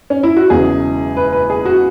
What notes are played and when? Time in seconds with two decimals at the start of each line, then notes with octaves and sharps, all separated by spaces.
0.10 C#4
0.23 E4
0.36 F#4
0.50 E1 E2 C#3 F#3 G#4
1.17 B4
1.33 B4
1.50 G#4
1.65 F#4